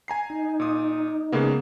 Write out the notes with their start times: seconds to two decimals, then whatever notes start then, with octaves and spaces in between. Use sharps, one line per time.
0.08 G#5 A#5 C7
0.30 D#4
0.60 A#2 D#6
1.32 C#3 G#3 A#3 B3 C#4